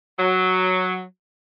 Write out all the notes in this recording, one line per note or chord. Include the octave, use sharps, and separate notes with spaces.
F#3